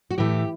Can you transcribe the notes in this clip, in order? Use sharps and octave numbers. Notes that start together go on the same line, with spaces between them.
F#4
A2 E3 A3 G4